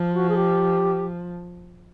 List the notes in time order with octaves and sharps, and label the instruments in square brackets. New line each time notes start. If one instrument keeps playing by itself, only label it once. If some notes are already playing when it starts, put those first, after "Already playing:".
Already playing: [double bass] F3
[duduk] F#4
G#4
G4